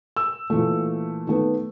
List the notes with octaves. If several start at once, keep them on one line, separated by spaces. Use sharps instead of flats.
E6
A#2 E3 A3
D#3 A3 B3